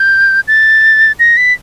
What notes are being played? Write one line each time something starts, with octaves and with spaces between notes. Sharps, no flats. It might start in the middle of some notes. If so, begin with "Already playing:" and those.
Already playing: G6
A6
A#6
B6